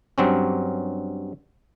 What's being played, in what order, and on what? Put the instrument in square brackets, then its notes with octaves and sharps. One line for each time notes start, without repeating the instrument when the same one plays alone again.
[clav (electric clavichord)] G2 F#3 C4 C#4